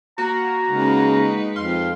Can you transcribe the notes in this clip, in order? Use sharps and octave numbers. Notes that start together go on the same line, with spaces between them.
A#3 F#4 A#5
C#3 G#3 D#4 B4
F2 F5 C6